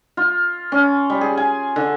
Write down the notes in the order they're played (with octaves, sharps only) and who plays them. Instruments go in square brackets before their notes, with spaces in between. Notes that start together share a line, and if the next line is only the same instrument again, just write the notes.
[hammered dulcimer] F4
C#4
G3
G#4
G#5
D3